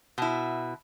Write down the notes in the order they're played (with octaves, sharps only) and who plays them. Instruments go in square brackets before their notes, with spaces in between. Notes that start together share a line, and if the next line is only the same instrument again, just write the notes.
[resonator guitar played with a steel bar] B2 E4